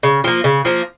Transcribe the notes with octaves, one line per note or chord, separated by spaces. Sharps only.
C#3
F3 A#3
C#3
F3 A#3